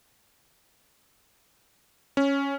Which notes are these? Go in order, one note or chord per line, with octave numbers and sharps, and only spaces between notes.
C#4